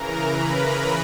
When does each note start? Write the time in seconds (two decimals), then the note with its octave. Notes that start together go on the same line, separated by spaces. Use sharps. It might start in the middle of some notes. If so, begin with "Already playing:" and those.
Already playing: C#3 E3 A#4 A#5
0.29 B4 B5